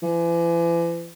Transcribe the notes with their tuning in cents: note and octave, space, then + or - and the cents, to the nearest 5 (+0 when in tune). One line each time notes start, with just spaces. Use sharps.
E3 +40